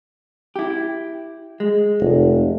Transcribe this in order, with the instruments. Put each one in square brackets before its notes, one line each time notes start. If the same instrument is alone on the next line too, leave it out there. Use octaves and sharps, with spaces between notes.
[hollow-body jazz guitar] E4 G4
G#3
[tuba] F1